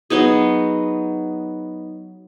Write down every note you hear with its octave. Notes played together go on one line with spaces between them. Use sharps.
F#3 B3 D#4 G#4